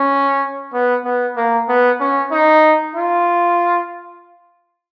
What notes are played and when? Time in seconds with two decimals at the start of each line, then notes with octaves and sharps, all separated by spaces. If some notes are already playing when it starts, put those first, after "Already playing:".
Already playing: C#4
0.73 B3
1.05 B3
1.37 A#3
1.69 B3
2.00 C#4
2.31 D#4
2.95 F4